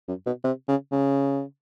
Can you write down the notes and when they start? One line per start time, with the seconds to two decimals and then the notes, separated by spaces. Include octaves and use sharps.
0.08 F#2
0.26 B2
0.44 C3
0.68 C#3
0.92 C#3